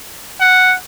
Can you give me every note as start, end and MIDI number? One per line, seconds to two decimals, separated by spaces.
0.40 0.76 78